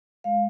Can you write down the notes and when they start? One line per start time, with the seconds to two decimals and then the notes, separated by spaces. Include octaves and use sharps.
0.24 G#3 F5